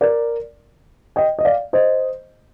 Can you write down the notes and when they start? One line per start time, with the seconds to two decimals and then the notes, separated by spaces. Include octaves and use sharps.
0.01 A#4 D5
1.16 D#5 G5
1.39 D#5
1.45 D5 F5
1.73 C5 D#5